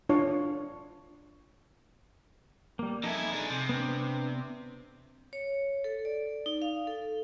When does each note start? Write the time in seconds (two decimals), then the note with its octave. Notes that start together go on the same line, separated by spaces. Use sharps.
0.09 D4 F4 C#5
2.79 G3 A#3
3.04 F2 D#4 E4 A4 G#5
3.33 D4 G#4
3.50 C3
3.69 B3 C4 D4
5.33 C#5
5.84 A4
6.05 D5
6.46 D#4
6.62 F5
6.87 A4